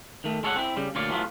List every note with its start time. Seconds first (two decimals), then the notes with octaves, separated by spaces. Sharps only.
0.24 D#3 A3
0.44 G#3 A4 C#5 F5 F#5
0.56 C4 E4
0.76 C#3 G3
0.95 D2 A#2 F4 C#5 D5
1.09 E3 F#3 A3 B3 F4